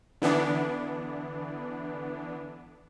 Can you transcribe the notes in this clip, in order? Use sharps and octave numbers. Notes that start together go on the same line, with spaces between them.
D3 E3 B3 D4